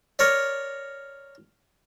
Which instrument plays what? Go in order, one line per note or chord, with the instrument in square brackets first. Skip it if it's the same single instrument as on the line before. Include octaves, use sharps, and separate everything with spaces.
[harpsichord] A#4 C#5 D5